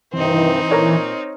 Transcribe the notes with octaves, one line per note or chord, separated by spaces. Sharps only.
G2 C3 D#3 E3 C4 D#4
A#2 A#4 C#5